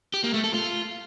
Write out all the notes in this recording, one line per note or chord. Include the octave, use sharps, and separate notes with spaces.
G4
A#3
A3
A4
F4